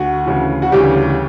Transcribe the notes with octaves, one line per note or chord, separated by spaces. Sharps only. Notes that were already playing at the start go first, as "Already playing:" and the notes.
Already playing: D2 F#4
D2 C#3 E3
F#4
D2 C#3 E3 G3 G4